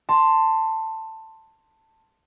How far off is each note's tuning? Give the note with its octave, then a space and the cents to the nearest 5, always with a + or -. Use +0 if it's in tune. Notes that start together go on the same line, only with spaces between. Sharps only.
A5 +15 C6 +0